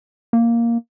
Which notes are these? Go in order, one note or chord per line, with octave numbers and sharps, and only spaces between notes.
A#3